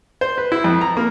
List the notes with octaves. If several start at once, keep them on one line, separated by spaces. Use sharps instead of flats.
C5
B4
E4
F2
A#5
A#3